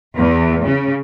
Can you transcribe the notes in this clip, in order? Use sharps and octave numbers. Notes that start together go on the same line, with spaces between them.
E2
C#3